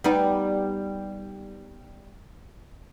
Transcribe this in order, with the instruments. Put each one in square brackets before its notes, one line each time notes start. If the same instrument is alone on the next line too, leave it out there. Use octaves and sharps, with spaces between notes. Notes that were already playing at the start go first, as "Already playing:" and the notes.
[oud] G3 B3 D#4